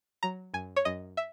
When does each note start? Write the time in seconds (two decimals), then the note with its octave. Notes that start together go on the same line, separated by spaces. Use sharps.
0.23 F#3 A#5
0.54 F#2 G#5
0.76 C#5
0.85 F#2 D#5
1.17 E5